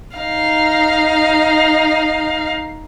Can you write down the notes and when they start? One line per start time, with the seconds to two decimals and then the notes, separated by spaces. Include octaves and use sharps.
0.17 D#4 F5